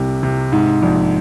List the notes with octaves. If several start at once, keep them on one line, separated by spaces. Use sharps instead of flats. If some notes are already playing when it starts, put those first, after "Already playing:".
Already playing: C2 C3
C3
G#2
A#1